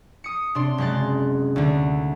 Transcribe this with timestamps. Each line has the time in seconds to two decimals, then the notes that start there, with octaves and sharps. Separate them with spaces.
0.24 D#6 C#7
0.55 C3 D4 C6
0.78 F#1 G#3 C6 F#6 A6
1.56 D2 D3